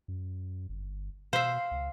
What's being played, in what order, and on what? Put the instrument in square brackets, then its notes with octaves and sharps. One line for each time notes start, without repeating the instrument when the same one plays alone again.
[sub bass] F#2
G1
[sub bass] B2 [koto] C5 E5 [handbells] F5
[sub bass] C#2